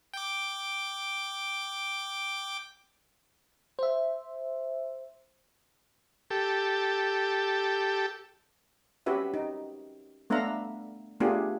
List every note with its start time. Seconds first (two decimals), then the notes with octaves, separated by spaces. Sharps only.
0.14 G5 D6
3.79 C5 E5
6.30 G4 A4
9.06 C#4 F#4 G4 B4 E5
9.34 D#4
10.30 A3 B3 D4 E5 F5 A#5
11.20 A3 B3 D4 F4 G4 G#4